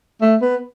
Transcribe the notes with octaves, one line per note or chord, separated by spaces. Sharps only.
A3
B3